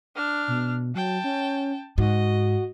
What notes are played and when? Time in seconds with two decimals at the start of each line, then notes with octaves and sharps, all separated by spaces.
0.15 D4 F6
0.48 B2
0.95 F#3 G5 A5
1.24 C#4
1.98 G#2 F#4 D#5